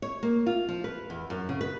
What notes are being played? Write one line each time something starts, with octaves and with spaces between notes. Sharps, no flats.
C#5
A#3
F4
F3
B4
E2
F#2
C#3
B4